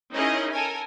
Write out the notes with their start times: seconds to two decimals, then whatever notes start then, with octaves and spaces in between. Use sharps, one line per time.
0.13 C#4 D#4 E4 G#4 A#4 D#5
0.52 A4 A#4 G#5